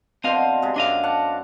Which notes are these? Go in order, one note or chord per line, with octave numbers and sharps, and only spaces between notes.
B2 D3 C4 C5 D#5 F5
C3 G#3
F#2 D4 D#5 F5 D6
D5 F#5 A5